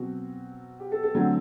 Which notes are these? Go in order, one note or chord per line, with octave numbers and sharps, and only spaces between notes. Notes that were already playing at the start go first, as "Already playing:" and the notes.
Already playing: B2 F#3 C4 F#4
G4
A4
A4
D3 F#3 A3 C4 A4